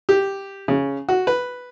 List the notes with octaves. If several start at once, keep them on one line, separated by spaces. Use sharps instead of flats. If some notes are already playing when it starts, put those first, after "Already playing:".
G4
C#3
F#4
B4